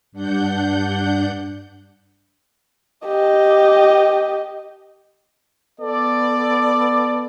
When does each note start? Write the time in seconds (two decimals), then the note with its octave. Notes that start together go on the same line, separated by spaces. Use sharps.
0.12 G2 D4 F#5 G6
3.06 G4 D#5
5.81 B3 A4 D5